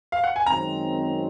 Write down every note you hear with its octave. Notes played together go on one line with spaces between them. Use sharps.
F5
F#5
G#5
F#2 D#3 G#3 C4 A#5